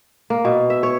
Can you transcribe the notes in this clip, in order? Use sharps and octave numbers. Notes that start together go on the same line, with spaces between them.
A#3
B2
E5
C#5